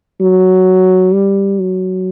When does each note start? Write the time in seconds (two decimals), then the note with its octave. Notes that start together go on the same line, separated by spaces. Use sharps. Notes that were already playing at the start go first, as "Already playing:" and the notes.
0.20 F#3
1.14 G3
1.59 F#3